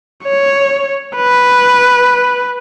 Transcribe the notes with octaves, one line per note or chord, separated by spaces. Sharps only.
C#5
B4